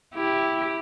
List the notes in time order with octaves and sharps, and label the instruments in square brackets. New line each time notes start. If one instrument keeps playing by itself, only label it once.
[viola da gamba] E4 G4